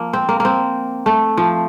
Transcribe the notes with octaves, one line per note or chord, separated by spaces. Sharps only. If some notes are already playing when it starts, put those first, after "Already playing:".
Already playing: F3 A#3
C4
A#3
A#3 C4
A3
F3